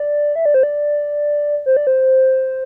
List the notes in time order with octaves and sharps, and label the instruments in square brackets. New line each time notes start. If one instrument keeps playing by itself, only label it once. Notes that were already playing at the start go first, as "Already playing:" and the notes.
Already playing: [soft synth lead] D5
E5
D5
C5
D5
C5
D5
C5